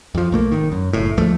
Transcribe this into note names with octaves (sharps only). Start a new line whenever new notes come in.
F2 F3
B1 A3 A#3
G#1 D#3
F#2
F#1 A2
D2 G#2 F3 A3